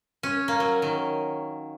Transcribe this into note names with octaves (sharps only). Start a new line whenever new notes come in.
C#4
A#3
F#3
D#3